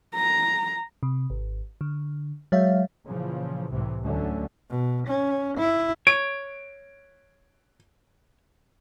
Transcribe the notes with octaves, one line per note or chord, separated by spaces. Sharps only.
A#5
C3
G#1
D3
F#3 G#3 C#5 E5 F5
A#2 C#3 E3 F3
C2 A2 C3 E3
D2 D3 F#3 A3 C#4
B2
C#4
E4
C#5 D7